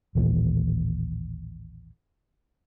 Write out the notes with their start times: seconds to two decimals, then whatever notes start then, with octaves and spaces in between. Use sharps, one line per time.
0.15 A1 D#2 A#2 E3